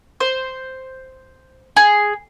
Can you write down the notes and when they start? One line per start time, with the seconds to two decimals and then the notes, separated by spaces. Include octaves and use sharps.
0.20 C5
1.77 G#4